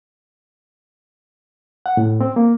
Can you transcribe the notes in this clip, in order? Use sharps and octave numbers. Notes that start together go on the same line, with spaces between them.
F#5
A2
C4
A#3